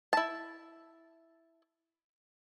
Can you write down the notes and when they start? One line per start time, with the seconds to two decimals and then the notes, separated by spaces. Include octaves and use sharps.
0.13 E4 A5